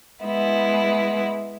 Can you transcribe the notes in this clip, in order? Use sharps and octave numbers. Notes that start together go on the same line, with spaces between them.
G#3 B3 E4